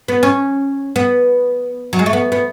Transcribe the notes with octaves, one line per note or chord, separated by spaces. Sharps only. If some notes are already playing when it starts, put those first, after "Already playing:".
B3
C#4
B3
F#3
G#3
A3
B3
B3